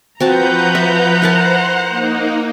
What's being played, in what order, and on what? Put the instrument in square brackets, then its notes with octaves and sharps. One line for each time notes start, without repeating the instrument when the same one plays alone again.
[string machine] F3 B4 G6 [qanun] C4 F#4 A5 [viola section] F#5 A#5
[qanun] E5
[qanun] E4 A#4 A5 [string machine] C5
[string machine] A#3 D#4